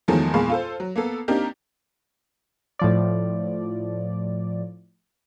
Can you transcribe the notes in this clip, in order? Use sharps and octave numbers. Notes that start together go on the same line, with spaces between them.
E2 D#3 F3 F#3 G#3 A3
E2 A#2 G#3 F5 B5 C#6
F4 A4 C5
F#3
A#3 B3 A4
A#3 C4 D4 D#4 G4 A#4
A2 F3 D5